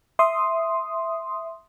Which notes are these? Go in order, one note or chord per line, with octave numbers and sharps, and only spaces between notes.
E5 C6 D#6